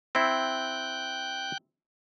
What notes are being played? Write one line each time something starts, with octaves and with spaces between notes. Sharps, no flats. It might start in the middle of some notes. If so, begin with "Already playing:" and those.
C4 E4 G5 F#6 G6